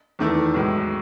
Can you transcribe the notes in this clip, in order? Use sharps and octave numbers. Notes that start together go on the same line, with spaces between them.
E2 D#3 A3 E4
B1 A2 G#3